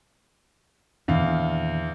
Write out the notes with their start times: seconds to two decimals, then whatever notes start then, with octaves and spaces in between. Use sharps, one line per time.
1.08 E2 A#2 D#3 D4 F5